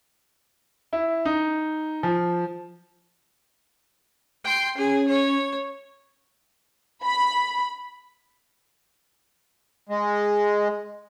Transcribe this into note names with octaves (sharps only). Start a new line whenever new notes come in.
E4
D#4
F3
G5 C6
C#4 G#4
C#5
B5
G#3